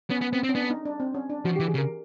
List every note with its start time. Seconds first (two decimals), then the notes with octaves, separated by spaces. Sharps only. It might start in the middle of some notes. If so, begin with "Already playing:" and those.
0.10 B3 C#4
0.21 B3
0.32 B3 C4
0.44 C4
0.49 C#4
0.54 B3 D4
0.70 D#4
0.85 D4
1.00 C4
1.14 C#4
1.30 D4
1.45 F3 F#4
1.56 G4
1.60 E3
1.67 G#4
1.75 C#3
1.78 A#4